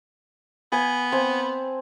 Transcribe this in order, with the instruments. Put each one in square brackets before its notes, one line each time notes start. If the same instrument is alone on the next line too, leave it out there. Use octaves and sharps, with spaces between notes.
[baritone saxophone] B3 [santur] G#5
[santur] C4 G#5 A5